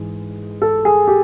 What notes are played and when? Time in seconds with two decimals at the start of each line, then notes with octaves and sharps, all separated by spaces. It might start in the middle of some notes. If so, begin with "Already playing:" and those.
Already playing: G#2 E3 G#3
0.62 A4
0.85 G#4
1.08 G4